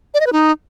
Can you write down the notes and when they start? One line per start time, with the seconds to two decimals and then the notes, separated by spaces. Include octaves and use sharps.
0.14 D5
0.20 D#5
0.27 B4
0.33 D#4